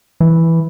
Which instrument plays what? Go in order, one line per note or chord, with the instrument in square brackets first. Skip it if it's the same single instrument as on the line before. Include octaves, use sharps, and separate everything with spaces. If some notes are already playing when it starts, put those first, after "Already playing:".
[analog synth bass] E3